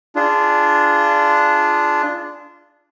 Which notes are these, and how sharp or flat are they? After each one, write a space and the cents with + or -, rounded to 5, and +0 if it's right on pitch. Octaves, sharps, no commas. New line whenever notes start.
D4 +0 F4 -20 G#4 +0